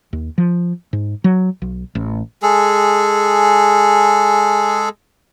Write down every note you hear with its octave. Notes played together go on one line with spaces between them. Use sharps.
D#2
F3
G#2
F#3
B1
A1
G#3 G#4 A4